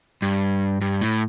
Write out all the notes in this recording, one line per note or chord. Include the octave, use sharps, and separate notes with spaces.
G2
G2
A2